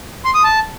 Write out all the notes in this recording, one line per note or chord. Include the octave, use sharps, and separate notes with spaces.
C6
D#6
A5